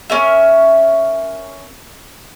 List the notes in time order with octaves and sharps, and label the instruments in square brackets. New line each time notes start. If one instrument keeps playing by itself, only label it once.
[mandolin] C#4 A#4 E5